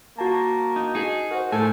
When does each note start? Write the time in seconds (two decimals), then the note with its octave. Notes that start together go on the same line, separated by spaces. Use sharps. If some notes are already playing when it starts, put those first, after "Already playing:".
0.19 A#3 F#4 A5
0.76 D#4
0.95 D#4 G#4
1.31 F#4 A#4 C5
1.52 A2 A4 G#5